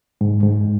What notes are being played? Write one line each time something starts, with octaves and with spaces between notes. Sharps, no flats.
G#2
G#2